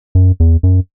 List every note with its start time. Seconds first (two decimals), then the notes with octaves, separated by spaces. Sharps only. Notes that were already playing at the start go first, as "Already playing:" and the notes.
0.15 F#2
0.40 E2
0.63 F#2